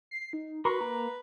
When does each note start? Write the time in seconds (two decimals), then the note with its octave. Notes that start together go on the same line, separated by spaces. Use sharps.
0.11 C7
0.33 D#4
0.65 F#4 A#4 B4 C6 C#6
0.81 A#3 A#5